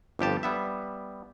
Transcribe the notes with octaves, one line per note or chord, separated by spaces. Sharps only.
G1 F2 G4 A5
G3 B3 E5